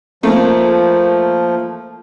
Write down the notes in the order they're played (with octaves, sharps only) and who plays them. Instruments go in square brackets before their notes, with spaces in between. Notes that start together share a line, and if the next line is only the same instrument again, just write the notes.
[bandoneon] F3 [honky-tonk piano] A3 A#3